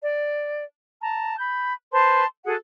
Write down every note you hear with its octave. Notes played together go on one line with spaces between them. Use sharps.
D5
A5 A#5
B5 G6
B4 C5 A5 C6
F#4 G#4 A4 F#5